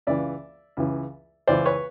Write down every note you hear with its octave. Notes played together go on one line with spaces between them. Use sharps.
C#2 C#3 E3 D5 E5
C#2 C#3 E3
C#2 C#3 E3 C5 D5
B4 C#5